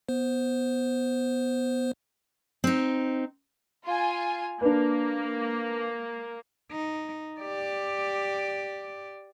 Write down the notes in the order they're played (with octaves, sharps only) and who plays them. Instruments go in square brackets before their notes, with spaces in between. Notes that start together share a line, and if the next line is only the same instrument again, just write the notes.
[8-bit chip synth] B3 C5
[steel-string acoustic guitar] C4 D#4
[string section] F4 G#5
[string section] A#3 [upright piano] D4 B4
[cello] D#4
G4 D5